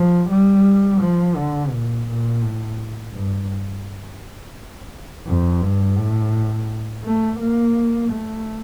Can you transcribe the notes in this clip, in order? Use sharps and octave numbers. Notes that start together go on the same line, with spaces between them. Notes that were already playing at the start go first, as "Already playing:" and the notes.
Already playing: F3
G3
F3
D3
A#2
A#2
A2
G2
F2
G2
A2
A3
A#3
A3